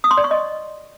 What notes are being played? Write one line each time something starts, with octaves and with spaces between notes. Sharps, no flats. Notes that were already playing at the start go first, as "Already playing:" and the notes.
D#6
C6
D5
C#6
D#5